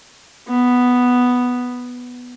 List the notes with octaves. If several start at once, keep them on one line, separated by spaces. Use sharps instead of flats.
B3